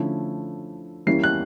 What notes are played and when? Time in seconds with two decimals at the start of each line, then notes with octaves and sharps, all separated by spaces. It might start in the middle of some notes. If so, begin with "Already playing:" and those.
Already playing: D3 F3 A3 C#4 E4
1.06 E3 G3 A#3 C#4 E4 C7
1.24 F#6